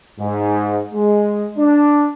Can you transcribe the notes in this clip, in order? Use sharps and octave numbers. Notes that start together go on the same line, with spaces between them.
G#2
G#3
D4